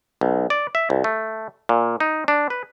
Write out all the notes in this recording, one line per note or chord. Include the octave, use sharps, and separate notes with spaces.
B1
D5
E5
C2
A3
A#2
D#4
D4
B4